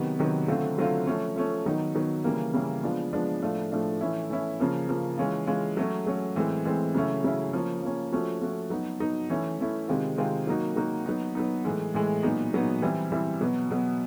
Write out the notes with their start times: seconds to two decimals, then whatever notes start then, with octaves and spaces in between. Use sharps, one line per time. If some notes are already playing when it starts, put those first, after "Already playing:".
Already playing: C3 D#3 F#3 B3
0.19 C3 D#3 F#3 B3
0.48 D3 F#3 A3 C4 F4
0.78 D3 F#3 A3 C4 F4
1.07 F3 A3 C#4
1.36 F3 A3 C#4
1.66 D#3 F#3 B3 D#4
1.95 D#3 F#3 B3 D#4
2.24 C#3 E3 G3 A#3
2.54 C#3 E3 G3 A#3
2.83 F3 G#3 B3 D4 F4
3.13 F3 G#3 B3 D4 F4
3.42 A2 F3 A3 D4 F4
3.71 A2 F3 A3 D4 F4
4.01 E3 A3 C#4 E4
4.30 E3 A3 C#4 E4
4.60 C#3 F3 A#3
4.89 C#3 F3 A#3
5.18 E3 G#3 C#4 F4
5.47 E3 G#3 C#4 F4
5.77 F#3 A3 C#4
6.07 F#3 A3 C#4
6.36 A2 E3 G#3 C4
6.65 A2 E3 G#3 C4
6.94 C#3 F#3 A3 C#4 E4
7.24 C#3 F#3 A3 C#4 E4
7.53 F3 A#3 C#4
7.83 F3 A#3 C#4
8.12 F3 A3 C#4 F#4
8.41 F3 A3 C#4 F#4
8.70 F#3 B3 D#4
9.00 F#3 B3 D#4
9.30 E3 A3 C#4 E4
9.59 E3 A3 C#4 E4
9.88 C3 D#3 G#3 C4 F4
10.17 C3 D#3 G#3 C4 F4
10.47 F#3 A#3 D#4 F#4
10.76 F#3 A#3 D#4 F#4
11.06 F#3 B3 D#4
11.35 F#3 B3 D#4
11.65 A2 E3 G#3
11.94 A2 E3 G#3
12.23 A#2 F#3 B3 D#4
12.53 A#2 F#3 B3 D#4
12.82 E3 G3 C4 E4
13.12 E3 G3 C4 E4
13.41 B2 F#3 B3
13.70 B2 F#3 B3